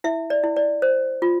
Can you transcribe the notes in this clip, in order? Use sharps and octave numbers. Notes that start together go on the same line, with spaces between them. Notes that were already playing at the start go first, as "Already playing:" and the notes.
E4 E5
D5
E4
D5
C5
F4